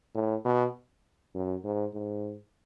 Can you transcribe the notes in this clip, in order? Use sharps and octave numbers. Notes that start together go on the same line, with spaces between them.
A2
B2
F#2
G#2
G#2